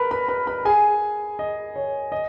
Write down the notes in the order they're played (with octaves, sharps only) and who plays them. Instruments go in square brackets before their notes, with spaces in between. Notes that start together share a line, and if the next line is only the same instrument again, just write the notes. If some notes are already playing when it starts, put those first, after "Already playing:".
Already playing: [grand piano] A#4 B4 B5
B4 B5
B4 B5
B4 B5
G#4 G#5
D#5
C#5
D#5